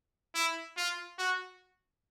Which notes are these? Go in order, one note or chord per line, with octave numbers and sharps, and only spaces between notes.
E4
F4
F#4